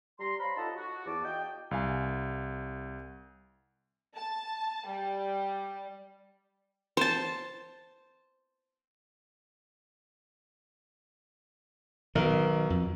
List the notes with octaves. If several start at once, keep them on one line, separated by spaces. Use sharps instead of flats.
G3 A#5 C6
C5 C#5 F5 A#5 B5
D#4 F4 A4 D#5 F#5 A5
F#4
E2 A5 D6
F#4 D#5 F5 G5
C2 F5 G#5
A5
G3
C5 A5
B1 D#3 A#4
F2